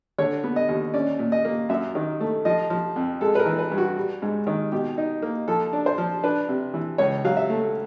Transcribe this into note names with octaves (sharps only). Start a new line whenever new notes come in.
D3 C#5
B3
D#5
D#2
C#4 D5
A#2
D#5
A#3
F#2 E5
D#3
A3
F3 D#5
F3
F2
G#3 A4
B4
A#4
E3
B4
G2
F#4
G3
G#2
D#3
B2 G4
D#4
A#3
F3 A4
D4
C5
F3
D4 B4
C3
E3
C#2 C#5
F#3 F5
E5
A3